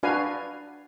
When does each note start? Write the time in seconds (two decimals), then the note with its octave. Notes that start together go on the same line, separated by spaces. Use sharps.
0.03 D4 F#4 B4 F5 G#5